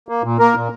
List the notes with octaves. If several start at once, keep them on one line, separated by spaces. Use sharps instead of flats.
A#3
A#2
A#3 A#4
A#2